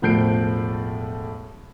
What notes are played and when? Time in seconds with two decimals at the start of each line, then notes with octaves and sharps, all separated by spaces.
0.02 E1 A2 F3 G6 C7 D7